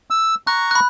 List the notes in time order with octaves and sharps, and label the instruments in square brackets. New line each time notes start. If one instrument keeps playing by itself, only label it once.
[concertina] E6
[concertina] A#5 C#6 [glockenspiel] F#6
[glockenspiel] B5 F#6